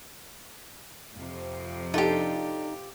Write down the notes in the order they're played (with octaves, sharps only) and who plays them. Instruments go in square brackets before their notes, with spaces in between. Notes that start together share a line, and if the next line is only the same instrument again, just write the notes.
[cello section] F2 C3 F3
[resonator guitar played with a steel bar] D4 A4 [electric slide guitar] D#4 [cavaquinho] F4 G4